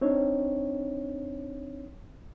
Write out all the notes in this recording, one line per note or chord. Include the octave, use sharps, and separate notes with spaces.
C4 D4 D#4 C#5